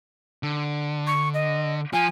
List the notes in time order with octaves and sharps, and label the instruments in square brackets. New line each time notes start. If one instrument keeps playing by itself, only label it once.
[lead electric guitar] D3
[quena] C#6
D#5
[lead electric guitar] F3 [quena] G#5